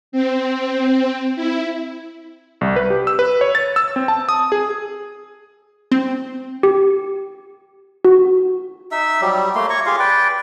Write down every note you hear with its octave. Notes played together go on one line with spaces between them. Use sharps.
C4
E4
C2
B4
G4
E6
B4
C#5
A6
E6
C4
A5
D#6
G#4
C4
G4
F#4
D#4 E5 E6
F#3 G3 G4
A3 A#3 C6
C#5 A#5 C#6
F4 G4 G#4 F5
B4 D5 G5